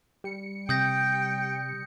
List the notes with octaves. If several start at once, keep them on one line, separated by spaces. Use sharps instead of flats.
G3 C#7
C3 G5 D#6 G6 A#6